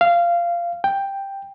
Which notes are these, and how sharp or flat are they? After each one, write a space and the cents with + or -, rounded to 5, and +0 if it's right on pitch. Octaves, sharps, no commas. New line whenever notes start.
F5 -15
G5 +5